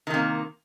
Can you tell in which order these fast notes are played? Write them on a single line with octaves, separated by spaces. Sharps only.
D#3 C3 A#3